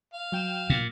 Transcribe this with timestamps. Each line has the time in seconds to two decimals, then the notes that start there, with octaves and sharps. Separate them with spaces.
0.14 F5
0.32 F#3 G5 E7
0.70 A#2